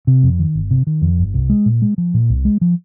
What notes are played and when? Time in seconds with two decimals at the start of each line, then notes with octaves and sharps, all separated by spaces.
0.07 C3
0.23 F2
0.39 D#3
0.55 G1
0.71 C3
0.87 D#3
1.02 F2
1.18 G1
1.34 C2
1.50 G#3
1.66 A#2
1.82 G#3
1.98 F3
2.14 A#2
2.30 C2
2.45 G#3
2.61 F3